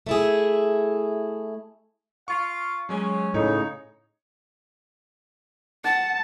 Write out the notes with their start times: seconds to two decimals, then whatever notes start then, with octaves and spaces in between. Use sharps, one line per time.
0.07 A3 E4 G#4
2.28 F4 F5 C#6
2.89 F#3 G#3 C#4
3.34 A2 C#3 D#4 C#5
5.85 F#5 A5